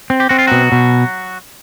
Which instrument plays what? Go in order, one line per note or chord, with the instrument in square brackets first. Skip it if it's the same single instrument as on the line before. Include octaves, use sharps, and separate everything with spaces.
[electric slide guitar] C4
[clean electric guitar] G4
[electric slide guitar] C4 [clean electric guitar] F#4
[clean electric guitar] F4
[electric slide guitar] B2 [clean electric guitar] F#3 F#4
[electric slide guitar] B2